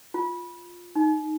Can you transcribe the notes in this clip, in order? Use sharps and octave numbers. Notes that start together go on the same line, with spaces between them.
F4
D#4